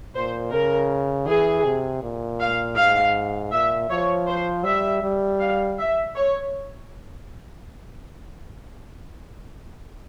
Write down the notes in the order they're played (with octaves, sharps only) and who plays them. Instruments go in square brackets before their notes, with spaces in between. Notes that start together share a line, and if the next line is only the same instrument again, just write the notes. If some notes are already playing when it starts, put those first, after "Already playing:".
[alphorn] A#2 [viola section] C5
[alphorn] C#3 [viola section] A#4
[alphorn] E3 [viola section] G#4
[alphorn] C3
A#2
[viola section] F5
[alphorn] G#2 [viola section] F5
[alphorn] A#2 [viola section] E5
[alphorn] F3 [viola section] C#5
[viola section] C5
[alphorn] G3 [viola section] E5
[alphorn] G3
[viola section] F5
E5
C#5